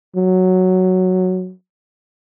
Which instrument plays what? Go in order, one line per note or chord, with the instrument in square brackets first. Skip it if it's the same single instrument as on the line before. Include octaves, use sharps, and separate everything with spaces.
[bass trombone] F#3